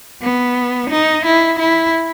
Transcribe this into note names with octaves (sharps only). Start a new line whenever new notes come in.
B3
D#4
E4
E4